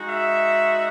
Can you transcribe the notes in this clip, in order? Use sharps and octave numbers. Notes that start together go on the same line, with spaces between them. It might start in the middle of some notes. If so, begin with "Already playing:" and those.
Already playing: G#3 D#4 F#4
E5